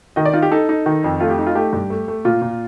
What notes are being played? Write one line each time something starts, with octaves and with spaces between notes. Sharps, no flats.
D#3 D#5
D5
D#4 F4
G4
D#4 A4
D#4
D#3
F2
A3 F4
G4
D#4
F4
A3 G4
G2
A3
A3
A#2 F4
A#2